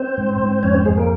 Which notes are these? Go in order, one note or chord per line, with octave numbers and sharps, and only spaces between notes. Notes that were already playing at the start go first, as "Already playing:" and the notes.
Already playing: C4 C5
G#2
G#2
F2 C#4 C#5
C4 C5
F2 G#3 G#4
A#3 A#4